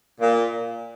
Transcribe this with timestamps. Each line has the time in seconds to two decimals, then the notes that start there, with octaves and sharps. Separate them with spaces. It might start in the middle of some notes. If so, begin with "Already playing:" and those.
0.20 A#2